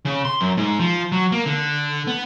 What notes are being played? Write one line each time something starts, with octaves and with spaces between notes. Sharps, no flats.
C#3
C6
F#2
G#2
F3
F#3
A#3
D3
B3